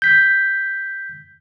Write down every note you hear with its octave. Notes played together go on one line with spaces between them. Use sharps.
G6 B6